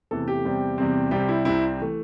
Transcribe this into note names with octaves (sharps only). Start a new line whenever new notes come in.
E2 C3 E3 A3 A4
G4
E2 C3 G3 C4
E2 C3 G3 C4
C2 C3 G3 C4 G4
E4
C2 C3 G3 C4 E4
E3 A3